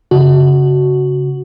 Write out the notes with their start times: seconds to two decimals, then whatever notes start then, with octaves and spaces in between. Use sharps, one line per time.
0.11 C#3 F#4